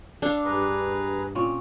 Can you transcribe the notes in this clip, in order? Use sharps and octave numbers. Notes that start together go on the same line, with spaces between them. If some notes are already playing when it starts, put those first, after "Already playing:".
D4 A4 F5
G2 G#4 B4 A#5
A#2 C4 C#4